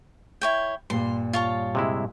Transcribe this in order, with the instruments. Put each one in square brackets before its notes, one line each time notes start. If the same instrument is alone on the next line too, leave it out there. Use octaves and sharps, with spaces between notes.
[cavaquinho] E4 C#5 G5
[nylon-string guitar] G2 A#2 G3 [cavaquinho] C6
[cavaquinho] F4 C#5 A5
[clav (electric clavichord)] C3 G#3 E4